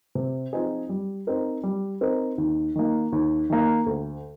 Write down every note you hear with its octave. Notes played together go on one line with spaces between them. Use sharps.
C3
F3 C4 D#4 G#4
G3
C4 D#4 A#4
G3
C4 D#4 A#4
D#2
D#3 A#3
D#2
D#3 A#3
D2